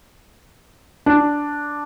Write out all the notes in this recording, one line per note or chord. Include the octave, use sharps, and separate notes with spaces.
D4